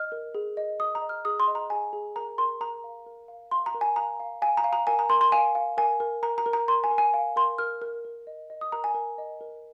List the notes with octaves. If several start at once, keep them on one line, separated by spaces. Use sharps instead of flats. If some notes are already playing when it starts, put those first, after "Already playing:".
Already playing: D#5 F6
A#4
G#4
D#5
D#5 D#6
A#5
D#5
F6
G#4 D#6
C6
D#5
A#5
G#4 G#5
G#4
A#4 A#5
A#4 C6
A#4 A#5
F5
A#4
F5
F5 C6
A#5
A#4
G#5
F5 A#5
F5
F5 G#5
A#5
F5
A#5
A#4 G#5
A#5
A#4 C6
C6
F5 G#5
F5
A#4 G#5
A#4
A#4 A#5
A#5
A#4
A#5
A#4 C6
G#5
A#4
G#5
F5
A#4 C6
A#4 F6
A#4
A#4
D#5
D#5
D#6
A#4 A#5
G#5
A#4
D#5
A#4